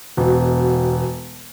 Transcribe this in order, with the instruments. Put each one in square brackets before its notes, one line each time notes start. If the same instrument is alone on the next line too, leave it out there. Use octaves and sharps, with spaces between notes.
[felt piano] E1 B2